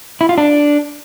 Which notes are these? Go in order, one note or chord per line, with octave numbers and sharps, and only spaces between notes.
E4
F4
D4